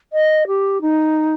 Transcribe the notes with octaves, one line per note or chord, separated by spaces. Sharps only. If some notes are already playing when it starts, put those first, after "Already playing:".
D#5
G4
D#4